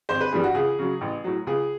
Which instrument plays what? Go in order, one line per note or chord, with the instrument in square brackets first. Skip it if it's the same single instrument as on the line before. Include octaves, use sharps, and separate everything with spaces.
[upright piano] G#1 C5
B4
G2 E3 G3 G#4
F#4
C#2 G#4
C#3 F#3
A1
A2 F#3
C#2 G#4